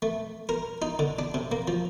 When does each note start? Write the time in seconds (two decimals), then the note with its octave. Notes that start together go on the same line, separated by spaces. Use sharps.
0.02 A3
0.49 A#4
0.82 D#4
0.99 D3
1.19 D4
1.34 C3
1.52 A#3
1.68 F3